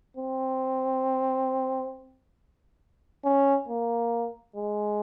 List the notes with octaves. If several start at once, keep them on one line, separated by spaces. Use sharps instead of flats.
C4
C#4
A#3
G#3